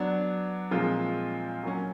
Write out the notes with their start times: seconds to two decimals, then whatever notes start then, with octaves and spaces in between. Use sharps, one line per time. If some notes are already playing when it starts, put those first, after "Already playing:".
Already playing: F#3 B3 D4
0.71 A#2 F3 G#3 C4 F4
1.63 F#3 A#3 C#4